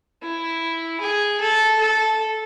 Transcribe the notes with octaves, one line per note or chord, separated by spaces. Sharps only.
E4
G#4
A4
A4